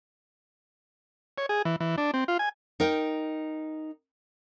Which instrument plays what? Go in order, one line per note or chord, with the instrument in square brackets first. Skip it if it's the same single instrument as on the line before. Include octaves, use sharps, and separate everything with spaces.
[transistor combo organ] C#5
G#4
E3
E3
D4
C4
F4
G#5
[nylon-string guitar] D#4 A#4 G5